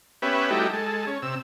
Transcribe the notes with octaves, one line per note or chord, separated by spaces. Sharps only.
B3 C#4 G4 B4 E5
F#3 G3 A3 D#4 E4 G4
G#3 A4
C#4
C3 E6